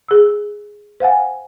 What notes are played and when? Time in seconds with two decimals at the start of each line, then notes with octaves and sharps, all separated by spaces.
0.08 G#4 E6
1.00 C5 F5 F#5 G#5